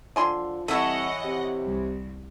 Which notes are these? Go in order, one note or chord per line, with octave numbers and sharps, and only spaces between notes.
D3 F3 G#5 C6
C2 E3 A4 C#5 D#5 E5 F#5
C3
C2